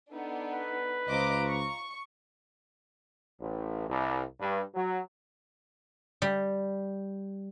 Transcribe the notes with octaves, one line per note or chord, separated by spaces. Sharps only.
B3 D4 D#4 A4
B4
C#2 F4 C5 D#5 A#5 D6
C#6
A1
C2
G2
F#3
G3